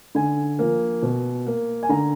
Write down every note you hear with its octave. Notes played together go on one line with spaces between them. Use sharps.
D3 G#5
F3 A#3
B2
A#3
G#5
D3 A#5